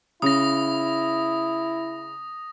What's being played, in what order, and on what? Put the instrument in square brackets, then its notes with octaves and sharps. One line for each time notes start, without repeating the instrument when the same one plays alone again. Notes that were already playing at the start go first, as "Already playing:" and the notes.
[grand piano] C#3 [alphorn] E4 [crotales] D#6 A#6